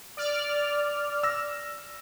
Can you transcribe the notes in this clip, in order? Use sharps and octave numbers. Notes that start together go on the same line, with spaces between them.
D5 F6
E6 A#6